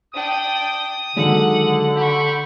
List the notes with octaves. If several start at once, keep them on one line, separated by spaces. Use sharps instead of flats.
D4 G5 D#6
D3 D#3 F#3 G#3 F#5
G4 F#5 B5 C#6